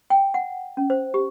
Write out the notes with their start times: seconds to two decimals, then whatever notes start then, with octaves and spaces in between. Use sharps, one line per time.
0.10 G5
0.34 F#5
0.77 C#4
0.90 C5
1.14 G4